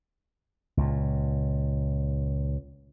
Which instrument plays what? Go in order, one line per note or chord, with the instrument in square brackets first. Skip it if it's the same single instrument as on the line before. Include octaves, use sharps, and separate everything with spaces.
[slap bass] C#2 A#2